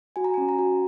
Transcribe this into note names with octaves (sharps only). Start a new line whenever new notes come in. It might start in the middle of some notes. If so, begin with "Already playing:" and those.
F#4 G#5
A#5
C#4 G#5
A#5
F#4